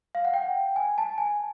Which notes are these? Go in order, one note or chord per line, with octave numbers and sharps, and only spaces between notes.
F5
F#5
G5
G#5
A5
G#5